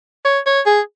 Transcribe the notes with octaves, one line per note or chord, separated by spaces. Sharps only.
C#5
C#5
G#4